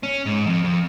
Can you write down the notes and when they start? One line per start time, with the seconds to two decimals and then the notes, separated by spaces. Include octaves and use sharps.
0.03 C#4
0.26 G#2
0.46 F2
0.64 F2